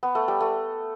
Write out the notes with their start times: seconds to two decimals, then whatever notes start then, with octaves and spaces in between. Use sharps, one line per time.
0.03 B3
0.15 A3
0.28 G3
0.41 A3